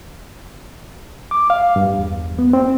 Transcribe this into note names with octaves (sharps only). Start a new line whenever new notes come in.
D6
F5
G2
E2
B3
C4